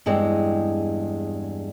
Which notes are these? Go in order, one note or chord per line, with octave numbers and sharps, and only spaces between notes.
E2 G2 G#3 C4